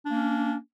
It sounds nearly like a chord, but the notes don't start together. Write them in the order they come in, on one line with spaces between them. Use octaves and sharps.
D4 A#3 C#4